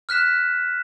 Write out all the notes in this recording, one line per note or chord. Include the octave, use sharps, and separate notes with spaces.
F6 F#6 B6 E7